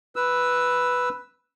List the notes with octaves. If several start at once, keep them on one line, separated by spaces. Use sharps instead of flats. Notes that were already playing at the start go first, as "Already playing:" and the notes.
B4 E6